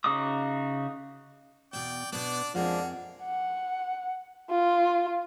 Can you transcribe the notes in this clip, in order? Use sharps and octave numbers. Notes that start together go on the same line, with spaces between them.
C#3 D#4 F#4 D6 D#6
E2 B2 D5 G5
B2 B3 D4 D5
F2 F3 G#3 A#3 D4 G#4 F#5
F#5
F4